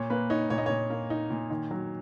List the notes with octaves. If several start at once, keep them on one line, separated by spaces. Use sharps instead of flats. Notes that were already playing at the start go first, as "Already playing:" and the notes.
Already playing: A#2 C#5
A#3 B4
D#4 C#5
A#2 C#5
D#5
A#2 C#5
A#3
D#4
A#2
D#3
F#3